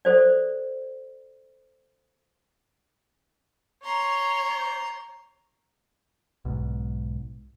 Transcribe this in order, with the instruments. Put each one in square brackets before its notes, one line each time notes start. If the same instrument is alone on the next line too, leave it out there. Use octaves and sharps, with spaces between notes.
[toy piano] A4 C5 D5
[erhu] C#5 [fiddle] A#5 C6
[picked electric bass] B1 G#2